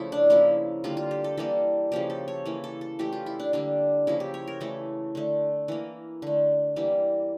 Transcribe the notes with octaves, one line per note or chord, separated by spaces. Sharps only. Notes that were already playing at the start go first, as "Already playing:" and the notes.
Already playing: C#3 F3 A3 E4 A4
D4
C#3 F3 A#3 E4
D3 G3 A#3 F4
F4
G4
A4
E3 G3 A#3 A4
C#3 F3 A#3 G4
A4
C#5
C#3 E3 A#3
A4
A4
E3 A3 G4
F4
E4
D4
D3 G3 A#3 D4
C#3 F3 A#3 E4
G4
C#5
A#4
C#3 E3 A3 A4
D3 A3
E3 A#3
D3 A3
E3 G3 A#3